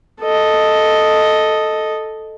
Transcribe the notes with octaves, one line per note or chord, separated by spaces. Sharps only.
A4 D#5